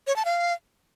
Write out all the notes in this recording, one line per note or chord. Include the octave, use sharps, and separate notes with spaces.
C#5
A5
F5